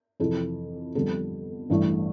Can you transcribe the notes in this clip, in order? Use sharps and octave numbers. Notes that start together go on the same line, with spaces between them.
F2 C3 E3 A4
F2 D3 G3 B3 A4
A1 G2 E3 A3